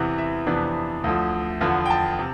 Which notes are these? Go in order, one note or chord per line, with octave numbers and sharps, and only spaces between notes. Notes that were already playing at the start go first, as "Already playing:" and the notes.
Already playing: E2 C3 E3 B3
E5
F2 C3 E3 B3 D4
D2 D3 F3
E2 D3 F3 B3
G5
A5
C3